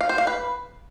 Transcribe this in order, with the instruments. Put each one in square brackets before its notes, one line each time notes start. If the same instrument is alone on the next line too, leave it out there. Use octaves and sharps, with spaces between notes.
[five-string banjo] F5
C5
F5
B4